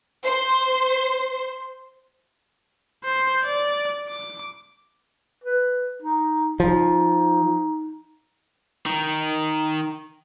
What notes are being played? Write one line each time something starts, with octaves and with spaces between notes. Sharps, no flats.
C5 C6
C5
D5
D6
B4
D#4
F3 D#4
D#3